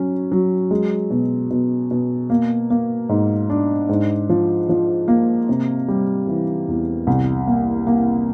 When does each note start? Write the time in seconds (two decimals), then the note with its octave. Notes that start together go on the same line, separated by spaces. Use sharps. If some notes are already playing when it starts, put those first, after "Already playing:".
Already playing: F#3 C#4
0.32 F#3
0.71 G#3
1.10 B2
1.50 B2
1.91 B2
2.30 A#3
2.70 A#3
3.09 G#2
3.50 D4
3.89 G#2
4.29 F3
4.69 F3
5.08 A#3
5.49 C3
5.88 G3
6.27 E3
6.68 E2
7.07 C2
7.47 A#3
7.87 A#3